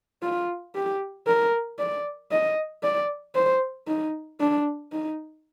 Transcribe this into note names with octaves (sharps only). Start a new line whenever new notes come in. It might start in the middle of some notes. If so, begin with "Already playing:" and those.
F4
G4
A#4
D5
D#5
D5
C5
D#4
D4
D#4